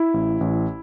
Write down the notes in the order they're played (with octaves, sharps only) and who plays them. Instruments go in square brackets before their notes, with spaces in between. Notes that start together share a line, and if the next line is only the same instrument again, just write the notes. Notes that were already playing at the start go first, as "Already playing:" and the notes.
Already playing: [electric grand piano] E4
A1
A1